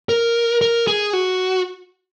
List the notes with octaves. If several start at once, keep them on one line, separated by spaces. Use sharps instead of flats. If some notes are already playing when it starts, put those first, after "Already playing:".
A#4
A#4
G#4
F#4